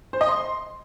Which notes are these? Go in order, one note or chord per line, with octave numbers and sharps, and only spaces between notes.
C5
D#5
C6